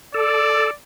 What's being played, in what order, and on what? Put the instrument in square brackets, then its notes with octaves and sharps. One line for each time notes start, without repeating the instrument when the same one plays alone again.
[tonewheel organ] A4 [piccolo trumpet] D5